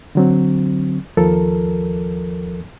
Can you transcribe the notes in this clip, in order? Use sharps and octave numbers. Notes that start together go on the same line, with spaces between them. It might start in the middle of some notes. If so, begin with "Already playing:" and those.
D3 F#3 C4
D#2 F3 A4 A#4